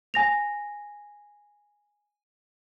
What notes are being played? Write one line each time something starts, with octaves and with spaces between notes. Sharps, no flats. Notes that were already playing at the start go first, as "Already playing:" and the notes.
G#5 A#6 F7